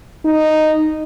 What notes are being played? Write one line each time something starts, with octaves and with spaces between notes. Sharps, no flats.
D#4